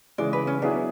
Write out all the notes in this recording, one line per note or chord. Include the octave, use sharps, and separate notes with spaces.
C#3 E3 G#3 D5
B4
C#4
F#3 B3 D4 E4 G#4